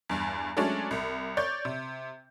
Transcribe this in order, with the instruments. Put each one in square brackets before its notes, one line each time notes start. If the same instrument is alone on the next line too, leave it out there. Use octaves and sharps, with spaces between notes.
[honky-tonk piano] E2 G2
F#3 G#3 A3 C#4 D4
C2
C#5 D5 G6
C3